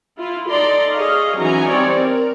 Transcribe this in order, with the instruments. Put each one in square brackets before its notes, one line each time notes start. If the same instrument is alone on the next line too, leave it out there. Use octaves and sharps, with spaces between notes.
[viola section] E4 F4
D#4 A4 D5 A#5 C6
G#4 C#5 D#5 F5
E3 F#3 C#4 D#4 G#5 A#5
G3 C4 C#5 D5
A#4